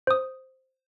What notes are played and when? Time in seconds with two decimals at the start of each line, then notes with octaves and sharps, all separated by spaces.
0.07 C5 D#6